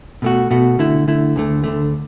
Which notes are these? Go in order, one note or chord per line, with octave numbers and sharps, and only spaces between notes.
B2 A3 F#4
B2 A3 F#4
D3 A3 E4
D3 A3 E4
D2 D3 A3
D2 D3 A3